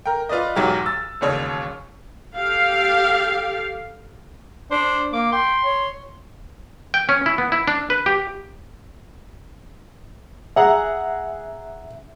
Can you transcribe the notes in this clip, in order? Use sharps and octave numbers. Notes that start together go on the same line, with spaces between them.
A#4 G5
F4 B4 D5 D#5
B1 E2 G#2 F#3 G4 F6
E6 A6
E1 D#2 C#3 C#5
G4 A4 F5
D4 C5
A#3 D6
G5 C6
C#5
G5
C#4
E4
B3
E4
D4
B4
G4
G#4 E5 F#5 A#5